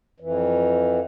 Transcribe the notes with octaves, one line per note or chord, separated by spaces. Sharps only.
F2 E3